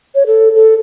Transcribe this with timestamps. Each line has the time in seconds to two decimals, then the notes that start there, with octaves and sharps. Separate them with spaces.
0.15 C#5
0.27 A4
0.55 A4